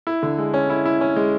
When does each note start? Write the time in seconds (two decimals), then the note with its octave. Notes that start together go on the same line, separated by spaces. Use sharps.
0.07 E4
0.23 D3
0.38 G#3
0.54 C#4
0.70 E4
0.85 E4
1.01 C#4
1.16 G#3